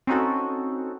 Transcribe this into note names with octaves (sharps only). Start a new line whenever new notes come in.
C4 C#4 D#4 F#4 A4